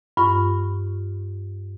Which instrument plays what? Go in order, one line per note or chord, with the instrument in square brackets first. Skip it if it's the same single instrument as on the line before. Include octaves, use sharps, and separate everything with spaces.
[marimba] G2 F4 C#6